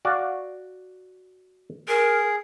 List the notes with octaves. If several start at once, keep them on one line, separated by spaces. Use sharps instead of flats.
F#4 D5 F5
G#4 A#4